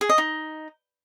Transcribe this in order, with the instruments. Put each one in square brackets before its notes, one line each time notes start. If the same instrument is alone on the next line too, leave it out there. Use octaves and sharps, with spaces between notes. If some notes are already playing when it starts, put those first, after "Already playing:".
[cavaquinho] G#4
D#5
D#4